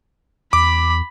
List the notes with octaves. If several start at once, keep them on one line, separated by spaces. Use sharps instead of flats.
E2 B5 D6